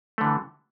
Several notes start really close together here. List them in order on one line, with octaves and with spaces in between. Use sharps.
A3 D3 E3